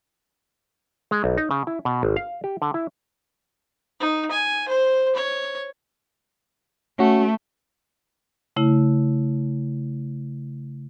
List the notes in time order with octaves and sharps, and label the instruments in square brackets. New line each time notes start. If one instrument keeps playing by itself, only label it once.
[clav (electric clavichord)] G#3
B1
D#4
C#3
E4
B2
G#1
F5
G4
D3
E4
[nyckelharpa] D#4
G#5
C5
C#5
[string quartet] A3 [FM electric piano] C#4 F#4
[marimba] C#3 A3 E4